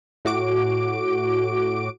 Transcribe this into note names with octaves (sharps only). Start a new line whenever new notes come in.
A2 F#4 D6 D7